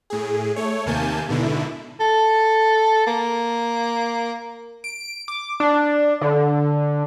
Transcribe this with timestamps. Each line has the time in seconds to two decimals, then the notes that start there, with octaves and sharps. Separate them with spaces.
0.10 A2 G#4
0.56 A3 C#5
0.86 D#2 C3 A#3 G#5 A5 G6
1.28 G#2 B2 D3 E4
2.00 A4
3.07 A#3
4.84 D7
5.28 D6
5.60 D4
6.21 D3